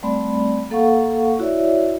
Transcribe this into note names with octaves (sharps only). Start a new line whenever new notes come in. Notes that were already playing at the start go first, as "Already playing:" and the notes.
G3 A3 C4 D5 B5
A#3 A4 F5 F#5 C#6
E4 F#4 C#5 D5 E5